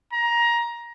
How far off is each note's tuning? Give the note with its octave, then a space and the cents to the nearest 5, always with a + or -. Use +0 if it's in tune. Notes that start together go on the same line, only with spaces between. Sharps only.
A#5 +20